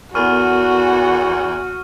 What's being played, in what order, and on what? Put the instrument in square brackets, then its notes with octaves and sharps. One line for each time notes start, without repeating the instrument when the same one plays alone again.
[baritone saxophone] E2 [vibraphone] B3 A4 A#4 [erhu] F#4 [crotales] C#6 F6 D#7